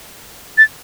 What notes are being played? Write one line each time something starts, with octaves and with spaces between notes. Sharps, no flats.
A6